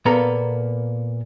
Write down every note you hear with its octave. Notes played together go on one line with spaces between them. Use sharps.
A#2 A#3 B3 A4 A#5